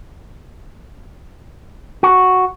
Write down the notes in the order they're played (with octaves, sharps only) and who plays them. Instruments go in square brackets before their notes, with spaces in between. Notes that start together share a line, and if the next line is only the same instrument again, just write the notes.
[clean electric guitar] F#4